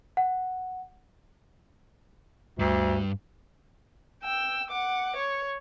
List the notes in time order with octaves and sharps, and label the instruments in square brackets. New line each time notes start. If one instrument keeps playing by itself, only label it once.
[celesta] F#5
[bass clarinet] D2 [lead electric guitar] G2
[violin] G5 E6
F#5 D6
C#5